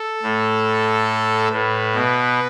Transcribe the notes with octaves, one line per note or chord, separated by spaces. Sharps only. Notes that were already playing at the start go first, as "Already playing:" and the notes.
Already playing: A4
A2
A2 B4
B2